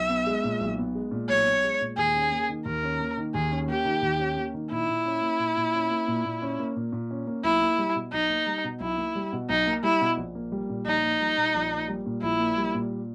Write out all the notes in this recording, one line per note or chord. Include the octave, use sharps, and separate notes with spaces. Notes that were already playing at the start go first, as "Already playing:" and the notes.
Already playing: B1 E5
B3
G#3
A#2
B1
B3
G#3
A#2
B1 C#5
B3
G#3
A#2
D#2 G#4
C#4
A#3
D#3
D#2 A#4
C#4
A#3
D#3
D#2 G#4
C#4
A#3 G4
D#3
D#2
C#4
A#3
D#3
A#2 E4
A#2
C#4
A#3
A#2
A#2
C#4
A#3
A#2
A#2
C#4
A#3
A#2
A#2
C#4
A#3
B1 E4
A#3
G3
B2
B1 D#4
A#3
G3
B2
B1 E4
A#3
G3
B2
B1 D#4
A#3
G3 E4
B2
A#1
A#3
G3
A#2
A#1 D#4
A#3
G3
A#2
A#1
A#3
G3
A#2
A#1 E4
A#3
G3
A#2